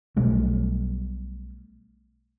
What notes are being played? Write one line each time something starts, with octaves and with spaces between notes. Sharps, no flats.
B1 B2 G3 A3